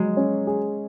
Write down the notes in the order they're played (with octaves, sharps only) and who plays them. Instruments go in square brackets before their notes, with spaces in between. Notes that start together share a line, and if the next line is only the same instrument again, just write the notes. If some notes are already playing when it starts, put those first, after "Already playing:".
Already playing: [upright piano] F#3 [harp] G#3
[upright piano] C#4
G#4